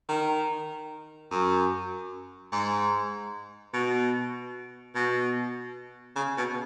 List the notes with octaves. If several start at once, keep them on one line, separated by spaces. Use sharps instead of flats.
D#3
F#2
G#2
B2
B2
C#3
B2